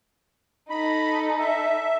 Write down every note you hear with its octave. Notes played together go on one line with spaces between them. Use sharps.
D#4 A4 B5
E5